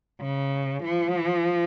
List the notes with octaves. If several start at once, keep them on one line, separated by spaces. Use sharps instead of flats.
C#3
F3